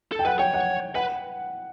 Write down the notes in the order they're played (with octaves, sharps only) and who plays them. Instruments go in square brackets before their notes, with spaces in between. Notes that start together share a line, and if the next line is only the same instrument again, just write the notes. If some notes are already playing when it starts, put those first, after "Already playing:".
[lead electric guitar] A4
[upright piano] G5
[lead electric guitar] B4 [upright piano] F#5
[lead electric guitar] C#5 [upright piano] G5
[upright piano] F#5
[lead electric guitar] B4 [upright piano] F#5